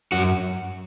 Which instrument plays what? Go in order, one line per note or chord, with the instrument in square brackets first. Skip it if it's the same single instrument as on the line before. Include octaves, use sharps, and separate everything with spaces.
[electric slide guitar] F#2 F#4